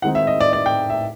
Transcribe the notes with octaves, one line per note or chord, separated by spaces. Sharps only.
D#3 G#3 C4 D#4 F#5
E5
D#5
D5
D5
G5
E5